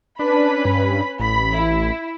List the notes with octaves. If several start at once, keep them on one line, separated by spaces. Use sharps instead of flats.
C#4 D4 B4 B5
G2
A1 B5
E4